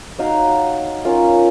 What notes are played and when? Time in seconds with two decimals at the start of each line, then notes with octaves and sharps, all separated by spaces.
0.19 D#4 F#4 C#5 F5
1.05 C#4 F4 A#4